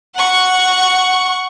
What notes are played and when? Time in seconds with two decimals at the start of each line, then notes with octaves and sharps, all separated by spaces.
0.16 F#5 C#6